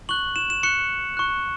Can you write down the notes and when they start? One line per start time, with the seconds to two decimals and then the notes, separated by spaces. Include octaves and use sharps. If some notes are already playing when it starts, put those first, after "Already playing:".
0.09 C#6 F#6 F#7
0.36 E7
0.50 E7
0.63 C#6 F#6 C#7
1.17 C#6 F#6